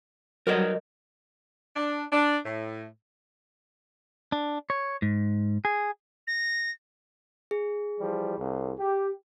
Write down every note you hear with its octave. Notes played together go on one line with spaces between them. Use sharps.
F#3 G3 A#4 D5 D#5
D4
D4
A2
D4
C#5
G#2
G#4
A#6
G#4
E3 F3 G3
C2
G4